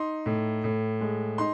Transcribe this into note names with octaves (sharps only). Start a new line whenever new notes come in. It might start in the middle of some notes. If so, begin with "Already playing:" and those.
Already playing: D#4 C6
A2
A2
G#3
D#4 C6